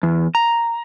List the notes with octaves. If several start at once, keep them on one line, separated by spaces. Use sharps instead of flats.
E2
A#5